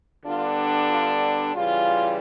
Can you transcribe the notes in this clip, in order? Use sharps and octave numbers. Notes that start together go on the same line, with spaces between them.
D3 G3 B3 D4 F4
F4
C#3 E3 G3 F4